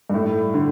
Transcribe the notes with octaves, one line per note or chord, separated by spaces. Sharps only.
G2
A2
D3